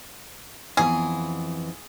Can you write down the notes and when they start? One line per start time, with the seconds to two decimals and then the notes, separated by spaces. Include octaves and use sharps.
0.77 F2 E3 B3 G#4